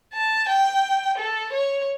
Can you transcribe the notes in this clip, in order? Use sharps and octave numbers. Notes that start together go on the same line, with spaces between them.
A5
G5
A4
C#5